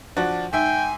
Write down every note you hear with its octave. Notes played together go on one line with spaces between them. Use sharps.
F3 D4 F#4
G#2 E5 G5 G#5